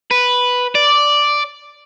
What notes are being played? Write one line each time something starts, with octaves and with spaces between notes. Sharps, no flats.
B4
D5